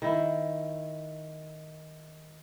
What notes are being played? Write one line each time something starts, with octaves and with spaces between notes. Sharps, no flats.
D#3 E4